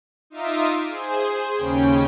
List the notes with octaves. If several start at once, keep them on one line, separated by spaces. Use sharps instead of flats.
D#4 F4 E5 F5 D6 D#6
G#4 C5
D#2 C#3 C#4 G5